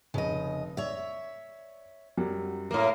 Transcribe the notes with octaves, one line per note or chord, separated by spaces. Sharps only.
F1 C#3 D#5
C#5 D5 E5
F#2 F#3 G3
A2 A#3